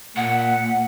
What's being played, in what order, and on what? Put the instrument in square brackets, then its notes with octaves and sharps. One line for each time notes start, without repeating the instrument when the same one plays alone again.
[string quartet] A#2 [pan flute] F#5